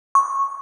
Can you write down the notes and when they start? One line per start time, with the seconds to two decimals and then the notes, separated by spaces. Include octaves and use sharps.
0.15 C#6